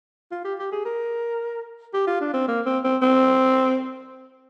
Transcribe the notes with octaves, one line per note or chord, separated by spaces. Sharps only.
F4
G4
G4
G#4
A#4
G4
F4
D4
C4
A#3
C4
C4
C4